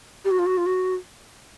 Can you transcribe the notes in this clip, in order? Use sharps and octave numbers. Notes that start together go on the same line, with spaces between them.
G4
F#4
F4
F#4
F4
F#4